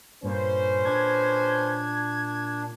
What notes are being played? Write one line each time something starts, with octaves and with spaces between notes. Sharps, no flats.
G2 A#2 C#4 B4 C5
D4 G#6